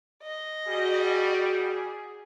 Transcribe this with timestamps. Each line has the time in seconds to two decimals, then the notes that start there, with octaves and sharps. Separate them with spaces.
0.23 D#5
0.67 G3 F#4 G#4